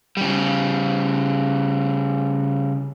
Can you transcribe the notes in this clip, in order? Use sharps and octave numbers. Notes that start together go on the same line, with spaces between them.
C#3 G3